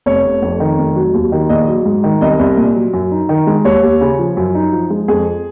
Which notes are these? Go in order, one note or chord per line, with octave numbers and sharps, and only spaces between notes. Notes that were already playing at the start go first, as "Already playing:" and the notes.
F1 C#5
F1
F2
D#3
F1
F#3
D#2
D#3
A#1 D#5
F#3
G#2
D#3
C2 D#5
C2
A#2
F#3
F#2
D#4
D#3
G#3
D#2 C#5
D#2
C#3
F3
F#2
D#4
F3
G#3
F2 G#4